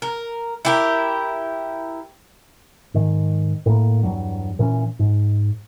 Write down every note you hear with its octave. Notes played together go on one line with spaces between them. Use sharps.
A#4
E4 G4 A#4
G#2 D#3
A2 A#3
E2 G2 F#3
A#2 E3 B3 C#4
G#2